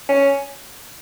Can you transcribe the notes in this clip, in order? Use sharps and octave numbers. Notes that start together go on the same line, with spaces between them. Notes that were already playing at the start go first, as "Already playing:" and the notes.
C#4